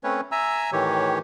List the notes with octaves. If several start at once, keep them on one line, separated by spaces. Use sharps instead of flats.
A3 C4 C#4 B4 C#5
E5 G#5 A#5 E6
A2 D#3 E3 G4 C#5